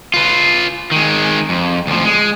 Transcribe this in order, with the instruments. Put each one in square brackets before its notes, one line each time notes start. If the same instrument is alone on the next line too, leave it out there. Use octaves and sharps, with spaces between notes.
[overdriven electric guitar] F4 B4
D#3 G#3
F2
D2 F3
G#3